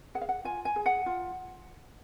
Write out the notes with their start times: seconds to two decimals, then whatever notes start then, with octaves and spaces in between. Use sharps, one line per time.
0.15 G#4 F#5
0.21 F5
0.29 F#5
0.44 F4 G#5
0.65 G#5
0.76 G#4
0.86 F#5
1.06 F4